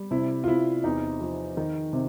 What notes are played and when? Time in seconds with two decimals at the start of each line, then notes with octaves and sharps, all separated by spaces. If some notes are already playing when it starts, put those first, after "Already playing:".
Already playing: G3
0.11 C3 E4
0.44 F4
0.47 C3 E4
0.84 E2 D#4
1.21 F3
1.57 D#3
1.93 C3